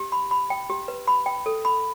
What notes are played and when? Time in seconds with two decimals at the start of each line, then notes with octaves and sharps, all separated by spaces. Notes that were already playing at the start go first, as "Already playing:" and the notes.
Already playing: G4
0.12 B5
0.31 B5
0.50 G5
0.70 G4
0.88 B4
1.08 B5
1.26 G5
1.46 A4
1.65 B5